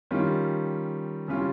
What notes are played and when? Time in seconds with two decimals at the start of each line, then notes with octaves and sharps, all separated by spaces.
0.11 D#3 G3 C#4 F4
1.28 C#3 G3 C#4 F4